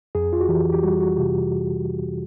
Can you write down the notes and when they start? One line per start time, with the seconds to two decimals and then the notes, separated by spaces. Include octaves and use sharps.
0.15 F2 G#4
0.33 F4
0.41 F#4
0.49 E3 G4
0.72 G4
0.83 G3 F#4
1.00 F#4
1.17 C3 G4